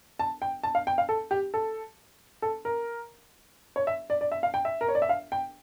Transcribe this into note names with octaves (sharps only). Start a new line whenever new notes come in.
A5
G5
A5
F5
G5
F5
A4
G4
A4
A4
A#4
C#5
E5
D5
D5
E5
F5
G5
E5
A#4
C#5
D5
E5
F5
G5